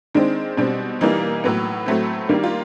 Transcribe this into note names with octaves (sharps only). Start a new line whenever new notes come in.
D#3 G#3 C4 D4
B2 G3 C4
E3 G3 A#3 D#4
A2 F#3 B3
A2 F#3 A3 C4
D#3 G3 A#3
F4